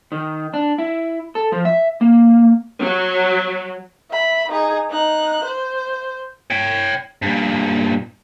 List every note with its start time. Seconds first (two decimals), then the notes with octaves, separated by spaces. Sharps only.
0.12 D#3
0.54 D4
0.78 E4
1.35 A4
1.52 F3
1.65 E5
2.01 A#3
2.80 F#3
4.10 E5 B5
4.50 D#4 G#4
4.90 D#4 F#6
5.44 C5
6.51 C#5 G5
7.22 G2 A#2